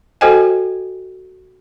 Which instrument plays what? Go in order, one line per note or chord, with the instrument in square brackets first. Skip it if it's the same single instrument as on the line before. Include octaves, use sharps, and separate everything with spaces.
[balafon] F#4 A4 C5 D#5 G5 G#5